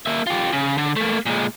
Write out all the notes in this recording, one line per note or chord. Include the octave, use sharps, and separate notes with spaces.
A#3 E5
F4 G4
C#3
D3
A3 A#3
A#2 G#3